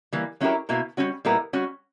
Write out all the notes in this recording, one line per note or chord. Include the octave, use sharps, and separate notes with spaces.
E3 G3 A#3
F#3 C#4 E4 G4 A#4
B2 A#3 E4 A#4
G3 C#4 F#4
A#2 G3 B3 E4 A#4
G3 C#4 F#4